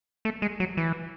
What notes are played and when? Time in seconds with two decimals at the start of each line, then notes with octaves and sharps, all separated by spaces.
0.25 A3
0.42 G#3
0.60 F#3
0.77 E3